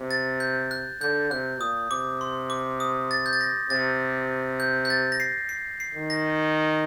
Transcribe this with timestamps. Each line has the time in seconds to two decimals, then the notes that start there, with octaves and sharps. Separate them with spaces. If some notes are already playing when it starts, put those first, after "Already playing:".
Already playing: C3
0.11 A6
0.40 G6
0.71 F#6
1.01 D3 G6
1.31 C3 F#6
1.60 A#2 D#6
1.91 C3 D6
2.21 C6
2.50 D6
2.80 D#6
3.11 A6
3.26 G6
3.33 A6
3.41 A#6
3.70 C3 A6
4.60 G6
4.85 G6
4.90 A6
5.12 A#6
5.20 C7
5.49 C7
5.80 C7
5.94 D#3
6.10 A#6